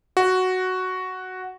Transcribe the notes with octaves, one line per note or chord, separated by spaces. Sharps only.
F#4